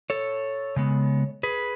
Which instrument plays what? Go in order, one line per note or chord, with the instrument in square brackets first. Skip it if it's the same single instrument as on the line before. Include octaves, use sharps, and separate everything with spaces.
[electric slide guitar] A4 C#5
C#3 G#3 B3
G#4 B4